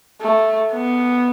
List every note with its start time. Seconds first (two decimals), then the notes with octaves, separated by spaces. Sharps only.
0.21 A3
0.72 B3